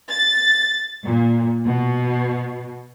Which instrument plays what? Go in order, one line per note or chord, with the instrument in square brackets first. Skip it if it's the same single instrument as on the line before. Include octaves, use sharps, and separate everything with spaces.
[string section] A6
A#2
B2